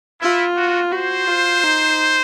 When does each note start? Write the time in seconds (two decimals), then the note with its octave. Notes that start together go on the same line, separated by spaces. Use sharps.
0.21 E4 F4
0.57 F#4
0.92 F#4 C5
1.27 F4
1.63 D#4